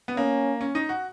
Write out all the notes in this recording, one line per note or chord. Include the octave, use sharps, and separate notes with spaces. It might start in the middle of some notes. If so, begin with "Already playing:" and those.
B3
A#3 C#4
C#4
D#4
F#4